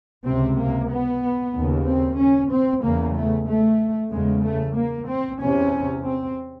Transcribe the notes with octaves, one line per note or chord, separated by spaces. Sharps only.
C#2 C3 C4
A#3
B3
D#2 C#3
C4
C#4
C4
E2 C#3 A#3
A3
A3
E2 C#3 G#3
A3
A#3
C4
E2 C3 C#4
C4